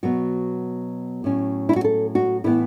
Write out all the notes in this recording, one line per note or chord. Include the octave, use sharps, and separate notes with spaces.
B2 F#3 B3 F#4
A2 F#3 C#4
E4
F#4
A4
F#4
A2 E3 B3 E4